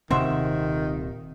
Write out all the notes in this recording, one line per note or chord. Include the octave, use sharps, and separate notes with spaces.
D#1 C3 D#3 C4 F#4 C5 E5